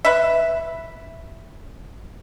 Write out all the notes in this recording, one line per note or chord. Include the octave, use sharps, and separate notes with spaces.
B4 E5